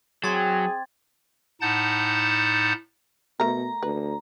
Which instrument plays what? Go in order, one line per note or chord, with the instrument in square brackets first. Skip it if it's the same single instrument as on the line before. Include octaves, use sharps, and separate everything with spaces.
[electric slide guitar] F#3 [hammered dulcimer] C4 D6 [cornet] G#4 [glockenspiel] C6 G#6 A6
[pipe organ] A2 D#4 F#5 A5 G6 A6
[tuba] B2 [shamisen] A3 A#4 [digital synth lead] A#5
[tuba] D2 [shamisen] B4